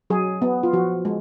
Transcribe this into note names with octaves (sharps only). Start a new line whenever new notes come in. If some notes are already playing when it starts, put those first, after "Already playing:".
F#3 G#4
B3
F4
F3 F#4
G#3